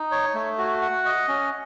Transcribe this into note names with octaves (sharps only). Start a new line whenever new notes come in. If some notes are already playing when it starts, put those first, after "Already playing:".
Already playing: D#4
C#5
A3
F#4
F#5
D#5
C#4